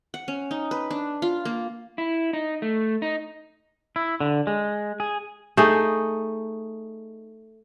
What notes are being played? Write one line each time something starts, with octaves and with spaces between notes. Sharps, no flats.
F#5
C#4
D#4
B4
D4
F4
A#3
E4
D#4
A3
D#4
E4
D3
G#3
G#4
A3 D#4 G#4